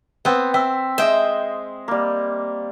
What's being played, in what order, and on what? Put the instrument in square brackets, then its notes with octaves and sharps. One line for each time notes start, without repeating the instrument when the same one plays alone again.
[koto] B3 C4
[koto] C4 [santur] E5
[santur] G#3 C4 D#5 [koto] C5 G5 [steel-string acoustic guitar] E5
[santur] G3 A#3